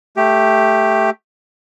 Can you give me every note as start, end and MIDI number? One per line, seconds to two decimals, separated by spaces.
0.17 1.10 57
0.17 1.10 67